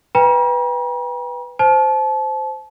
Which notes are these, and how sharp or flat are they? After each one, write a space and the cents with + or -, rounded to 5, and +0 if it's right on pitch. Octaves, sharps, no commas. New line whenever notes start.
B4 +0 G5 +30 A#5 +45
C5 -5 A5 -30